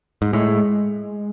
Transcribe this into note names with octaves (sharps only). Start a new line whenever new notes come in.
G#2
A2 G#3